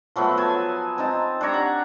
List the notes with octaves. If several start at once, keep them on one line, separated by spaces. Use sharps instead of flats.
F3 F#3 A3 B3
G#5 A5
C4 D#4 A5
D4 G4 C#5 A#5
F#5